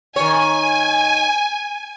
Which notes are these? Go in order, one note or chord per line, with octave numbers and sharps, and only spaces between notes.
D#3 C#5 G#5